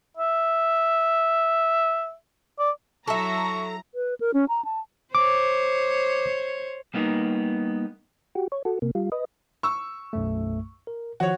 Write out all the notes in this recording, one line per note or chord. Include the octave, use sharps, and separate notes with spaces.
E5
D5
F#3 E4 A4 E5 A#5 C#6
B4
A#4
C#4
A#5
A5
C5 C#5 D6
G3 A#3 B3 D#4
F#4 G4
C#5
F#4 A4
C3 A#3
G3 F4
B4 D#5
C#6 E6
B1 F#2 A3
A#4
D#3 F3 F#4 C#5